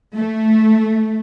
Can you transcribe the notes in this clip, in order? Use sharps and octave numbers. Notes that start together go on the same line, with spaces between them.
A3